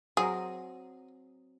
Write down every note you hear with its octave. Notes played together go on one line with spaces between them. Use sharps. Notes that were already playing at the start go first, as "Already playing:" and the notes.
F#3 C4 G#4 A#4